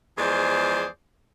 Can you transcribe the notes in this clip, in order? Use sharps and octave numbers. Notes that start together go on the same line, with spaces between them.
E2 F3 G#3 G#4 C5 D5